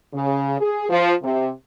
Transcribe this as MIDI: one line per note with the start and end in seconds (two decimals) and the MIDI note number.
0.14 0.59 49
0.60 0.86 68
0.89 1.14 53
1.22 1.49 48